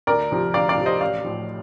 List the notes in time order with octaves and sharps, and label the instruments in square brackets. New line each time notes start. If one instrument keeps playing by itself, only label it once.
[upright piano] D2 A#4 D5
C3 F3
D2 D5 F5
D5 F5
C3 F3
C5 D#5
A1 D5 F5
A2 F3